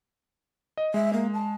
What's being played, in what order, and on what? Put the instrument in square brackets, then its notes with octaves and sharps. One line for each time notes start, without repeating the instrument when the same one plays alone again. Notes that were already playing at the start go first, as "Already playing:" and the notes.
[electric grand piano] D#5
[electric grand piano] G#3 [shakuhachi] E5
[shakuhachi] A#3
A5